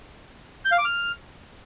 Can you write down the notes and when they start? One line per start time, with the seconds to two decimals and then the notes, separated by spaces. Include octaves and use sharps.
0.65 G6
0.72 F5
0.78 D6
0.85 F6